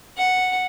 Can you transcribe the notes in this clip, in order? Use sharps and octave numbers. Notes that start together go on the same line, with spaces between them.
F#5